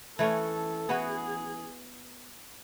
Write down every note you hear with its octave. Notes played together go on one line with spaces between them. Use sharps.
E3 A3 C#4 A4
E3 B3 F#4 G#4 B4